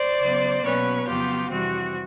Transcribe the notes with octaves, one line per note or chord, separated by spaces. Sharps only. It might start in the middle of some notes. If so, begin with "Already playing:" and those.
Already playing: C5 D5
C#3 F#3 B3
B2 F#3 A#3 C#4 B4 C#5
F2 C#3 F#3 B3 F4 G4
F2 C3 E3 G3 C4 F#4